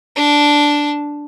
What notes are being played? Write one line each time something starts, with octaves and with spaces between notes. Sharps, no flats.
D4 A5